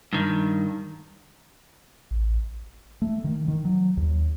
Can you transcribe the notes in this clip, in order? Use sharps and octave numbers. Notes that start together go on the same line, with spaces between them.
G2 D#3
A1
A3
D#3
D#3
F#3
D#2